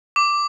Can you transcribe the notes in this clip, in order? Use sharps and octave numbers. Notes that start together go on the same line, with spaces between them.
D6